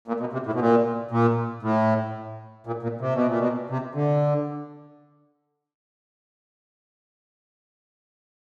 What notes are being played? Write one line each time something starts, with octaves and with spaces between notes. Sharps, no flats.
A#2
B2
C3
A2
B2
A#2
A#2
A2
A#2
A#2
C3
B2
A#2
B2
C3
D3